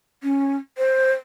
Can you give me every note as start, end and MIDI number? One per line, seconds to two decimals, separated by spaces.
0.23 0.57 61
0.78 1.13 72